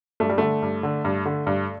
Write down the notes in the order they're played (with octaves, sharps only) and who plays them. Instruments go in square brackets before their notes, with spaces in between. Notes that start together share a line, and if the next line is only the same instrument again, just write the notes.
[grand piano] G2 A3
G3
D3 A3
G2
D3
G2
D3
G2